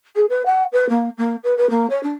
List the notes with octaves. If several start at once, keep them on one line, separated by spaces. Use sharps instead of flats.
G#4
B4
F#5
B4
A#3
A#3
B4
B4
A#3
C#5
D4